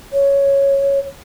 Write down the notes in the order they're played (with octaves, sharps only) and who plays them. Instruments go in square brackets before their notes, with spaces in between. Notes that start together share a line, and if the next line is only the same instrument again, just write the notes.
[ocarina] C#5